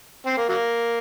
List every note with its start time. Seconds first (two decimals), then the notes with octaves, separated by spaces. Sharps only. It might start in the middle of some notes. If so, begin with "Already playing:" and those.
0.26 C4
0.37 A#3
0.48 F#3 A#3